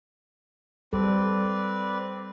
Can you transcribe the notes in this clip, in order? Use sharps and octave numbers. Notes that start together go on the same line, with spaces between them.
G3 C4 A4 B4 D5